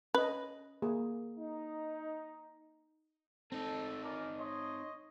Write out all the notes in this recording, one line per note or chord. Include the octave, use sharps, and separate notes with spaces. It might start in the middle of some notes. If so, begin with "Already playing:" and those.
C#4 B4 D#5
A#3 G#4
D#4
C4 D#4 A4
C#4 A#4 D5
C#5 D#5 C6